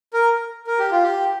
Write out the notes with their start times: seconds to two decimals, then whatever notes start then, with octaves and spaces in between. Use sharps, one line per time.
0.13 A#4
0.67 A#4
0.79 G4
0.91 F4
1.03 G4